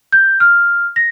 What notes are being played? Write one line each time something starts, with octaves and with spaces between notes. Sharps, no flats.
G6
F6
A#6